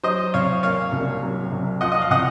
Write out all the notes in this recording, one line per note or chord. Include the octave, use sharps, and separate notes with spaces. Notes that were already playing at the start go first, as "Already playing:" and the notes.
F#3 C5 D#5
C3 C#5 F5
A#3 C#5 F5
C2
F#3
C3
F3 D#5 F#5
D#5
F5
C3 D#5 F#5